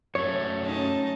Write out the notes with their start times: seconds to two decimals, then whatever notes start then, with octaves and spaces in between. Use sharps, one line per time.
0.15 F#2 A3 C#5
0.65 C#4 D#4 A5